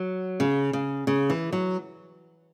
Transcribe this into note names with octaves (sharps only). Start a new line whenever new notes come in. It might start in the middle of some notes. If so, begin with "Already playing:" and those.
Already playing: F#3
C#3
C#3
C#3
E3
F#3